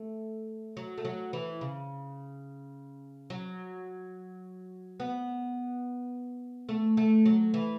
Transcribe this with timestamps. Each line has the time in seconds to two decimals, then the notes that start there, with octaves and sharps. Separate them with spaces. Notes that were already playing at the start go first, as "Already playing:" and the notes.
Already playing: A3
0.77 F#3
0.98 A3
1.05 F#3
1.33 E3
1.61 C#3
3.30 F#3
5.00 B3
6.69 A3
6.97 A3
7.25 F#3
7.54 E3